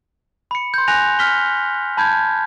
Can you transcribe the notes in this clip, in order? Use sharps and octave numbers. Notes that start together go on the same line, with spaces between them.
B5 C#7
C6 G6
G#5 F#6 A#6 F7
F6 B6 G7
A5 B5 G6 G#6